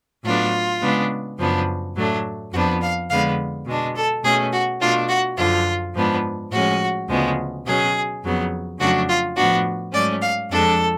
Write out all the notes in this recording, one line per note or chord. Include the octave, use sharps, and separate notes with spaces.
A2 F#3 B3 D4 F4
C#3 G#3 B3 D4
F#2 C#3 F3 B3 D4
A2 F#3 A3 D4
F2 F3 B3 D4 F#4
F5
F2 D3 G#3 B3 F5
B2 G#3 D4
A4
B2 A3 C#4 G#4
F#4
B2 A3 D4 F4
F#4
F#2 D3 F3 F4
G#2 F3 B3 D4
A2 F3 G#3 C#4 F#4
D2 C#3 F3 G#3 B3
B2 F#3 C#4 G#4
F2 C#3 F#3 B3
F2 C#3 F#3 A3 D4 F#4
F4
A2 F3 B3 D4 F#4
G#2 F#3 A3 C#4 D5
F5
F2 F3 G#3 D4 A4